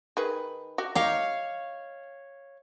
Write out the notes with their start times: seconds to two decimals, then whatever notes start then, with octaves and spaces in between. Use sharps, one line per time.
0.17 D#3 G#4 B4
0.78 F#4 G4
0.95 D#4 G4 C#5 F5